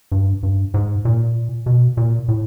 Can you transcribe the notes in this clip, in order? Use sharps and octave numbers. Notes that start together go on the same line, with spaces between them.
G2
G2
G#2
A#2
B2
A#2
A2